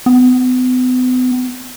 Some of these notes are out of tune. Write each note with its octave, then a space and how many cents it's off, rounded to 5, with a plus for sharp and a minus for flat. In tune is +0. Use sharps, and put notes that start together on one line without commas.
B3 +40